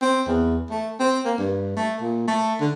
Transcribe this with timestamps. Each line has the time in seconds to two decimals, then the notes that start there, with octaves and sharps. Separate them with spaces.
0.02 C4
0.28 E2
0.70 A3
0.99 C4
1.25 A#3
1.39 G2
1.77 A3
2.01 A#2
2.27 A3
2.60 D3